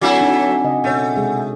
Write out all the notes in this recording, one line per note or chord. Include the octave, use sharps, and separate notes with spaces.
F#3 A3 C4 D4 E4 F#4 F#5 G#5
D4 D#4
C#3 D#5
B2 A3 C#5
C3 G#3 G#4